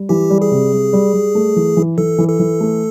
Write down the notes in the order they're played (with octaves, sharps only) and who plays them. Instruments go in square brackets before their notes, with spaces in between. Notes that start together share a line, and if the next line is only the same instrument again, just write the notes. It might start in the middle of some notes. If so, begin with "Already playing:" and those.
Already playing: [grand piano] G3
[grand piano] E3 [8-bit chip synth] G4
[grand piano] G3
[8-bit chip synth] G#4
[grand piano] C3
G3
G3
G3
A3
E3
E3
[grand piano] E3 [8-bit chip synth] A4
[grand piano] E3
[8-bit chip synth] A4
[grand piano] E3
A3